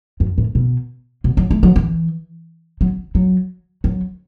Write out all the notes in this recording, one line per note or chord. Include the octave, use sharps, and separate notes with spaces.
F#2
A2
B2
B2
F#3
A3
F#3
E3
F#3
F#3
F#3